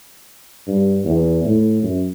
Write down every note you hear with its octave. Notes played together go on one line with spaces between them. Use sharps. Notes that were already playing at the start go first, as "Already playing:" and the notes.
G2
E2
A2
F#2